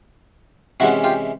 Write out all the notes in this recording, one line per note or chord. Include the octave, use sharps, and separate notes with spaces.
C3 E3 G#3 C#4 E4 F#4
F4 G4